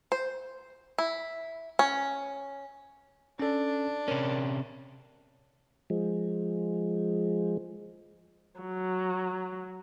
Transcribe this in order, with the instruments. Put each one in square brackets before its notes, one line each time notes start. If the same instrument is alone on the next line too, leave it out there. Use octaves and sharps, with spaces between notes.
[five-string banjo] C5
E4
C#4
[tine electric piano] C#4 A4 [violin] D4
[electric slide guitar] C3 C#4 [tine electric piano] A#4
[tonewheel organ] F3 G#3
[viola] F#3